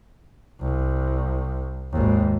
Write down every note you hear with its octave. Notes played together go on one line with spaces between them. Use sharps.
C2
G#1 D#2